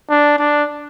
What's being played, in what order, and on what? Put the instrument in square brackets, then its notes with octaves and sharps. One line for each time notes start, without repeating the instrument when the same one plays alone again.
[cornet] D4
D4